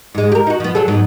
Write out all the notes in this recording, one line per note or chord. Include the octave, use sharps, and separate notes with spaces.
G#2 G#3
G4 A#4
D#4 F#4
F3 B3
F#3 G#4 A4
G#2 F#3 B3